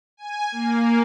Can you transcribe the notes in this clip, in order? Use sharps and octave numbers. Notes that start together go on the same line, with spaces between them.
G#5
A#3